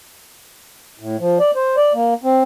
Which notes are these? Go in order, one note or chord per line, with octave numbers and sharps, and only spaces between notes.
A2
F3
D5
C5
D5
A#3
C4